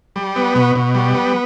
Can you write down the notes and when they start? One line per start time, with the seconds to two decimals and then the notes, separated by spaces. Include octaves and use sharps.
0.16 G3
0.36 B3
0.55 B2
0.75 B2
0.95 G3
1.14 B3